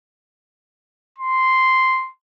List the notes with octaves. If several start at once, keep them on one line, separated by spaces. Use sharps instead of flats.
C6